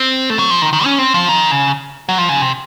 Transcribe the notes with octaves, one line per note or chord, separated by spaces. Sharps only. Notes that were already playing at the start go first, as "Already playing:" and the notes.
Already playing: C4
A3
F#3
F3
D#3
D#3
C#4
C4
F3
D#3
C#3
F#3
F3
C#3
C3